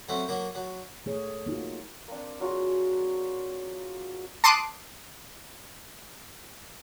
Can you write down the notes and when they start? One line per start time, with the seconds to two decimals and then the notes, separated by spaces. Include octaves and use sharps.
0.09 F#3 A3 C4 C#4
0.28 F#3 A#3 A#4
0.55 F#3
1.06 A3 G#4 C#5
1.46 A#3 D#4 F4 F#4
2.08 A#3 C4 D4
2.40 F#3 F4 F#4 G#4
4.44 A5 C6 D6 D#6 F#6